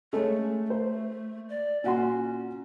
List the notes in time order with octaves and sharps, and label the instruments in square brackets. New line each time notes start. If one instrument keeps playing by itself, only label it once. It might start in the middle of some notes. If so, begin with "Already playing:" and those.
[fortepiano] G#3 C#4 A4 [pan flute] A3
[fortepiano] C5
[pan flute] D5
[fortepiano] A#2 F#4 C6 [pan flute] C#4